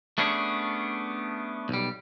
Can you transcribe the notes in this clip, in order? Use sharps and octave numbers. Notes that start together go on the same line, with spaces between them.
A3 B3 C#4 D4 G#4
B1 G3